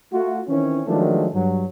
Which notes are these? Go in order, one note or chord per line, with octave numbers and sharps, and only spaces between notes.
A3 F4 F#4
D#3 E3 C4 C#4
D#3 F3 F#3 G#3 A3 D4
G2 F#3